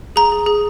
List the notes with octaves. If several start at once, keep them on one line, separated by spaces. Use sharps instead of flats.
G#4 A#5
G#4
G#4